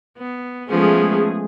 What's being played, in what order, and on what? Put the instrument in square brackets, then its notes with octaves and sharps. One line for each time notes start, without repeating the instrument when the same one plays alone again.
[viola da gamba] B3
[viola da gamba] F3 B3 C#4 [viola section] G#3 A3 G#4